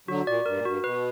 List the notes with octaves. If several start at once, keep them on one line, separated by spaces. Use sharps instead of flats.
D3 F#3 F#4
A#2 D5
G2 A#4
A#2
G2 F#4
B2 B4